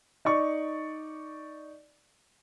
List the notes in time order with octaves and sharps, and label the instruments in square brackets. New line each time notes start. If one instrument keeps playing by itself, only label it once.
[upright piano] D#4 D5 C#6